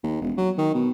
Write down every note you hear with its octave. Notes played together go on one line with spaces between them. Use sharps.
D#2
E1
F#3
D#3
B2